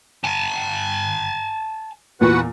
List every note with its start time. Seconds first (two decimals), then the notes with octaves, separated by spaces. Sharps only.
0.24 G#5 A5
2.21 E2 A#2 F#4 B4 F#5